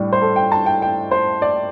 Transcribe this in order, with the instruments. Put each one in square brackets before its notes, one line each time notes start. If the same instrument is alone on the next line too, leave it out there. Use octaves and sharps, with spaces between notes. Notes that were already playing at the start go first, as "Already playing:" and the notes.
Already playing: [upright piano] A2 G3 D4
C5
A4
G5
A5
G5
G5
C5
D5